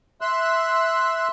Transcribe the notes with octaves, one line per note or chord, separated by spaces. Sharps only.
E5 C6 E6 F#6